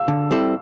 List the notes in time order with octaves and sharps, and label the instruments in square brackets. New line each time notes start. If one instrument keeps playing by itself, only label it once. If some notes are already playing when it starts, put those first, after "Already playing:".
Already playing: [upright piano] F5 E6
[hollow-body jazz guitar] D3
G3 C4 E4 A4